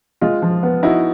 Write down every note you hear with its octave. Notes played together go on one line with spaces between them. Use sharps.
G#3 F4
F3
B3
D#4 E4 F#4